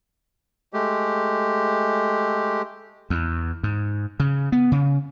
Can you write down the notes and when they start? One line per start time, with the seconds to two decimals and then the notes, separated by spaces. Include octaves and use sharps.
0.73 G#3 A3 G4
3.10 E2
3.63 G#2
4.20 C#3
4.52 B3
4.72 C#3